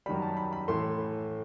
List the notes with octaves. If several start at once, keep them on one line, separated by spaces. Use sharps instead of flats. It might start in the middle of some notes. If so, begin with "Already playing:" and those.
F#2 D#3 G3 B5
A5
B5
B5
A2 E3 A3 C6